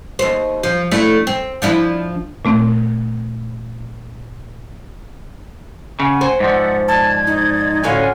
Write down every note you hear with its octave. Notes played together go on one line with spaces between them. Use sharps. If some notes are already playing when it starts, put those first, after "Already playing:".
D#2 C5
F3
A3 D4 E4
C4
F3 D4 E4
A#2 A3 C4
C#3 F#5 G#5
C4
G#2 F3 D5 E5 F#5
D5 A5 G#6
D#4
A2 D3 C#4 F4 F#4 G#5